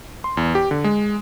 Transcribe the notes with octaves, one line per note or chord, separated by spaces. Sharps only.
C6
E2
G4
D3
G#3